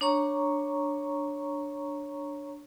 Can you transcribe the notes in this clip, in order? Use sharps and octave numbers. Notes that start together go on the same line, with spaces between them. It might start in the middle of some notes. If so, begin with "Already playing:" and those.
D4 C#5 A#5 C#6